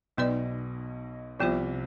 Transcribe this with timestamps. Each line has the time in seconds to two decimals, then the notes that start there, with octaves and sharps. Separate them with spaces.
0.17 B1 B2 B3 D#4 B4 D5
1.40 C2 C3 F3 B3 F4 C5